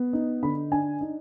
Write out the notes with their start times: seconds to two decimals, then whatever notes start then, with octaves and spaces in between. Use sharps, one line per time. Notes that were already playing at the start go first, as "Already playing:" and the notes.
Already playing: B3
0.13 D#4
0.43 D3 B5
0.72 D4 G#5
1.01 D#4